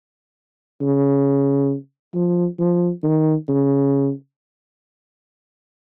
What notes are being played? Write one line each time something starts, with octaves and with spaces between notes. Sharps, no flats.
C#3
F3
F3
D#3
C#3